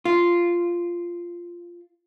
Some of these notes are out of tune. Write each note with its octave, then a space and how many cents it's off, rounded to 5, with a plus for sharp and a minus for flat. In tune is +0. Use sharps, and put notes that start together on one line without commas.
F4 -10